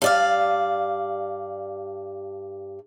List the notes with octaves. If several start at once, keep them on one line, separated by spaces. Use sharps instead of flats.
G2 D5 F5